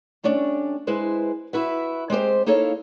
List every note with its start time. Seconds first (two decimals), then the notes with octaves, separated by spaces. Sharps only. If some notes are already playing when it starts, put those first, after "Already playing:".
0.24 G3 A3 C#4 D4
0.87 G#3 E4 B4 C5
1.53 E4 F#4 B4 E5
2.10 G#3 C4 G4 C5
2.46 A#3 D#4 E4 A4 C#5 F5